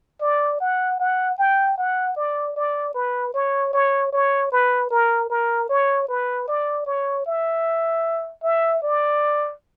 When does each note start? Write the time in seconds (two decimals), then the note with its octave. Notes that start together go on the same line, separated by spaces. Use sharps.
0.21 D5
0.60 F#5
1.00 F#5
1.38 G5
1.78 F#5
2.16 D5
2.56 D5
2.94 B4
3.34 C#5
3.73 C#5
4.12 C#5
4.52 B4
4.91 A#4
5.30 A#4
5.69 C#5
6.08 B4
6.48 D5
6.86 C#5
7.26 E5
8.43 E5
8.82 D5